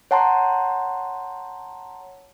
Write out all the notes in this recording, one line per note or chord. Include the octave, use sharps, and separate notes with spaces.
C#5 F#5 A5 A#5 C6